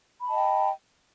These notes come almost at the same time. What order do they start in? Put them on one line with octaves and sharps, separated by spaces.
B5 A5 D#5 G5